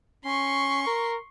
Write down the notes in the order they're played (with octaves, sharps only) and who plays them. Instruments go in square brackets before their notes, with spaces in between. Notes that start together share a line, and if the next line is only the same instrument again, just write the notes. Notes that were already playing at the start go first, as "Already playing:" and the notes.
[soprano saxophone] C#4 [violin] C6 C#6
[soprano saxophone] A#4